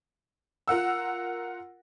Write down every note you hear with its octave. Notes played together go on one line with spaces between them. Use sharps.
F4 A#4 F#5 E6